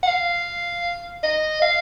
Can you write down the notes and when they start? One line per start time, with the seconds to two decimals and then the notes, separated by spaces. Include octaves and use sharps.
0.03 F#5
0.08 F5
1.23 D#5
1.62 F5